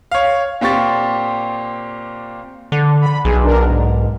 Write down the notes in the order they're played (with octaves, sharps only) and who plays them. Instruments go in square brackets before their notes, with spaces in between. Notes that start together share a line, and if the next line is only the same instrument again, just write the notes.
[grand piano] C#5 F5
A#2 C4 G4 C#6 A6
[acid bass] D3
[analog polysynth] B5
[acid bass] B1 [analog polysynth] G#4
[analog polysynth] D4 A#4
G#2